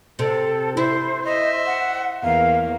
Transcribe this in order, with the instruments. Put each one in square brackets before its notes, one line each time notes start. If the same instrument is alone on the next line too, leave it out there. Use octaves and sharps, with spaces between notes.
[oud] C3 [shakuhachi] A4
[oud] E4 [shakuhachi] C5
[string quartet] C5 E5 [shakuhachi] D#5
[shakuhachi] F#5
[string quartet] E2 A#3 [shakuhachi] F5